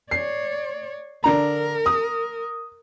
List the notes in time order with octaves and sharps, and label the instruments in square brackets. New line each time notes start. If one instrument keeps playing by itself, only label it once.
[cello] C#5 D5 [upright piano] C7
[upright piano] D3 D4 A#5 [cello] A#4
[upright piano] D#6